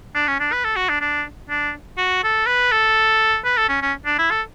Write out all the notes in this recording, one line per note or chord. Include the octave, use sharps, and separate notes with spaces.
D4
C#4
D4
B4
A4
F#4
D4
D4
D4
F#4
A4
B4
A4
B4
A4
C#4
C#4
D4
E4
A4